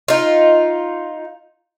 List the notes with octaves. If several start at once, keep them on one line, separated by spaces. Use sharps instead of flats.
D#4 F4